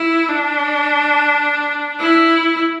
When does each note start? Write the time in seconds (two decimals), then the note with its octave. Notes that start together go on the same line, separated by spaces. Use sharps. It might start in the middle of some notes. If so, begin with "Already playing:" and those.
Already playing: E4
0.29 D4
2.00 E4